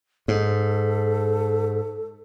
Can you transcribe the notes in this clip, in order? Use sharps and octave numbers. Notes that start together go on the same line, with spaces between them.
G#2 A4